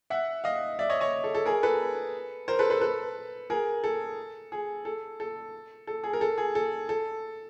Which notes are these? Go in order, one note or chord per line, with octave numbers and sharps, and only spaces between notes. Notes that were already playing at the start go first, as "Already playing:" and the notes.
E5 F#5
D#5 F5
D5 E5
C#5 D#5
C#5 D#5
A4
A4
G#4 A#4
A4 B4
A#4 C5
A4 B4
A4 B4
A4 B4
G#4 A#4
A4
G#4
A4
A4
A4
G#4
A#4
A4
G#4
A4
A4